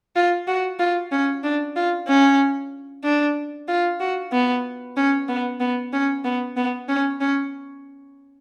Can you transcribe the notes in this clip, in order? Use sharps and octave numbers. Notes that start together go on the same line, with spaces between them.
F4
F#4
F4
C#4
D4
F4
C#4
D4
F4
F#4
B3
C#4
B3
B3
C#4
B3
B3
C#4
C#4